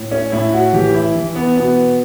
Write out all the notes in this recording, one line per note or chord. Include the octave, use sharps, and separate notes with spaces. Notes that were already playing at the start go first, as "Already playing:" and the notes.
Already playing: A2
C#4
A2 E4
F#4
E3 G4
E4
E3
B3
B2 B3